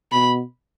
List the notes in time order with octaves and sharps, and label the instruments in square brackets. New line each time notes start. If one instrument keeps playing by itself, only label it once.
[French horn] B2 [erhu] B5